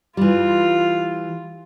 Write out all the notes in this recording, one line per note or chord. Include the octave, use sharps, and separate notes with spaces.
E3 G3 F4